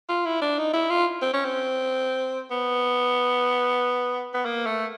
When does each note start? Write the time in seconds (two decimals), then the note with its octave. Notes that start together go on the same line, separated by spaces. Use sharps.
0.09 F4
0.25 E4
0.41 D4
0.58 D#4
0.73 E4
0.90 F4
1.22 C4
1.33 C#4
1.45 C4
2.51 B3
4.34 B3
4.45 A#3
4.66 A3